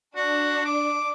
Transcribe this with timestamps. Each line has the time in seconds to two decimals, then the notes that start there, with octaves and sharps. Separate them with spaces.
0.16 D4 F#4
0.65 D6